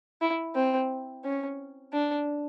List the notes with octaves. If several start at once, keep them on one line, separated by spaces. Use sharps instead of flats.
E4
C4
C#4
D4